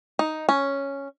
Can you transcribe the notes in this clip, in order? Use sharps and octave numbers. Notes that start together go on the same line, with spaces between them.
D#4
C#4